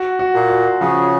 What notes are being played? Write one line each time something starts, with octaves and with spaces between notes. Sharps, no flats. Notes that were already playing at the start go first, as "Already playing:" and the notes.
Already playing: F#4
F#4
A#2
F#4
C#3 F3